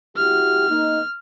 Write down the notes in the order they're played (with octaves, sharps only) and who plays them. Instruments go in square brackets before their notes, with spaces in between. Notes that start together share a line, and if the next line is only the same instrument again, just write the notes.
[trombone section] E4 F#4 G4 [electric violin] F6
[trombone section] A#3 D#4